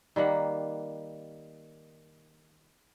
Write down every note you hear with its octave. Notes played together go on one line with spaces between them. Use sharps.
D#3 G3 A#3 F#5